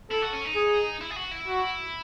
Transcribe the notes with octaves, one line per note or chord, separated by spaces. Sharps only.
E4 A4
F#4
C#4
D#4
G#4
E4
G#4
F#4
E4
F#4